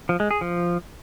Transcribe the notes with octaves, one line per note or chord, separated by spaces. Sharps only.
F3
G#3
G#4
F3